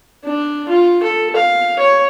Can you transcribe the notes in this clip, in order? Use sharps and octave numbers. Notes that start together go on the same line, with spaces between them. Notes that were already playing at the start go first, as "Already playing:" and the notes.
D4
F4
A4
F5
C#5